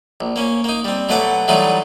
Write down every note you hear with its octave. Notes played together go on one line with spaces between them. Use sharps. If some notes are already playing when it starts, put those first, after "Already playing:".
A#1
A#3 C#4
A#3 D#4
G3 C4
B2 F#3 A3 B4 F#5 D6
E3 F#3 G3 A3 D#4 F4